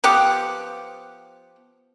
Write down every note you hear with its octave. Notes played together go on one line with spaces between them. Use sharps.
F3 B3 G4 F#5